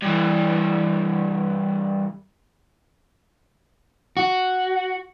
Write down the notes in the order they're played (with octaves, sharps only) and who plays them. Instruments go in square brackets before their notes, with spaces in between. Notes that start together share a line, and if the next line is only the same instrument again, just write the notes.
[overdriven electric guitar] G2 E3
[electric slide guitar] F#4